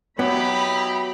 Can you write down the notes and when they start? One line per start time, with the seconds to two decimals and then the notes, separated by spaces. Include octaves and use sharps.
0.19 F#3 B3 D#4 E4 G4 B5